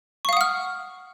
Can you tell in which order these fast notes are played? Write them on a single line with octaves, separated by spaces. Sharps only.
C#6 F5 D#6 F#5 F6